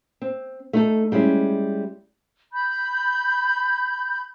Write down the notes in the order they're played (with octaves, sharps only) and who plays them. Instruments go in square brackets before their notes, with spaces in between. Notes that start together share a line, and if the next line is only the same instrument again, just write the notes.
[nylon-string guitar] C4
A3 D#4 A4
G3 G#3 C#4 E4
[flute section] B5 G6